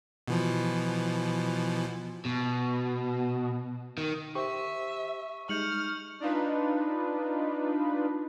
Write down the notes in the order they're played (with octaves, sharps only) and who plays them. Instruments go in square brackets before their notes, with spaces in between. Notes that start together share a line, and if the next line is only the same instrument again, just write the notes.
[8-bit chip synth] B2 E3 F3
[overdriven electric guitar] B2
D#3
[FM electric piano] G4 C5 [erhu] E5 [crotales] C#6
[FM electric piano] G3 G#3 D#4 [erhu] F6 [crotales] G6 C#7 F#7
[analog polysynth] D4 D#4 F4 B4